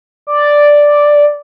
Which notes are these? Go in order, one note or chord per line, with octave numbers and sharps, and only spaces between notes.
D5